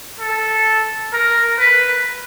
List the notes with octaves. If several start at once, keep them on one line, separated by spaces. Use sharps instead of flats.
A4
A#4
B4